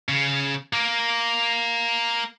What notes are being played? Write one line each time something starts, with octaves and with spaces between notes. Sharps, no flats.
C#3
A#3